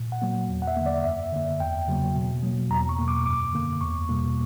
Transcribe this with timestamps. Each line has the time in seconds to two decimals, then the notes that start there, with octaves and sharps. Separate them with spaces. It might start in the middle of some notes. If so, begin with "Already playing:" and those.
Already playing: A#2
0.12 F#5
0.22 F#3 A#3
0.48 E2
0.62 F#5
0.67 E5
0.77 D3 A#3
0.86 D5
1.04 F#2 E5
1.32 D3 A#3
1.60 E2 G5
1.88 C#3 F#3 A#3
2.16 B2
2.43 F#3 A#3
2.70 E2 A#5
2.89 C#6
2.99 B2 A#3
3.08 D6
3.26 F#2 D6
3.53 D3 A#3
3.81 E2 C#6
4.09 B2 G3 A#3